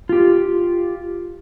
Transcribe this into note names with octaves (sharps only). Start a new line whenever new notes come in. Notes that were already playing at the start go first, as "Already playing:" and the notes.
F4 G4